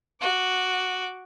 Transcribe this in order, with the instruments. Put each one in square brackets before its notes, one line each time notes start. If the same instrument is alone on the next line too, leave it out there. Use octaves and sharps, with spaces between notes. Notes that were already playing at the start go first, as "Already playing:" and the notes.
[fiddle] F#4 D6